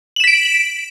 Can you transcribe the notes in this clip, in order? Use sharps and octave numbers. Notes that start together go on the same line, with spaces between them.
B6 D7 E7 F#7